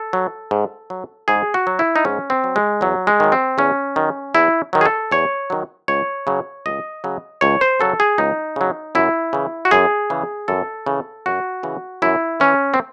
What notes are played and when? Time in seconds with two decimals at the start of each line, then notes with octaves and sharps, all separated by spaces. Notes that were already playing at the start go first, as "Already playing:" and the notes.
Already playing: A4
0.13 F#3
0.51 G#2
0.90 F#3
1.28 G#2 G#4
1.54 F#4
1.67 F#3
1.79 E4
1.96 D#4
2.05 G#2 C#4
2.30 C4
2.44 F#3
2.56 G#3
2.81 E2 F#3
3.07 G#3
3.20 D#3 F#3
3.32 C4
3.58 E2 C#4
3.96 D#3 F#3
4.34 E2 E4
4.73 D#3 F#3
4.81 G#4
4.86 A4
5.11 E2 C#5
5.50 D#3 F#3
5.88 C#2 C#5
6.27 C#3 F#3
6.66 C#2 D#5
7.04 C#3 F#3
7.41 C#2 C#5
7.61 C5
7.80 C#3 F#3 A4
8.00 G#4
8.18 C#2 D#4
8.56 C#3 F#3
8.95 F#2 E4
9.33 C#3 E3
9.65 F#4
9.71 F#2 G#4
10.10 C#3 E3
10.48 F#2 A4
10.86 C#3 E3
11.26 F#2 F#4
11.63 C#3 E3
12.02 F#2 E4
12.40 E3 C#4
12.74 C4